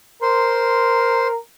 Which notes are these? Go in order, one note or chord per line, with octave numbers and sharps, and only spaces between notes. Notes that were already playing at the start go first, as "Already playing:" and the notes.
A#4 C5 C6